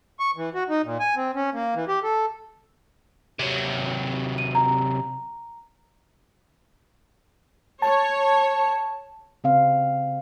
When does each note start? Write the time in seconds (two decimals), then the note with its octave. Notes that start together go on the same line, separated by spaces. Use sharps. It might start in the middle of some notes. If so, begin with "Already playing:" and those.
0.19 C#6
0.36 E3
0.54 F#4
0.69 D#4
0.84 A#2
1.00 G#5
1.16 C4
1.36 C#4
1.53 A#3
1.75 E3
1.88 G4
2.03 A4
3.39 C3 F#3
4.38 D#7
4.55 A#5
7.82 C#5 A5
9.44 C#3 C4 F5